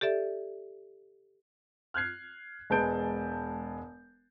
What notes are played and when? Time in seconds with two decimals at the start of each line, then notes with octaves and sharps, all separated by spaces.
0.01 G4 A4 D5 E5
1.94 F6 F#6 G#6 C7
2.70 E1 G#3 B4 A5 G6 D7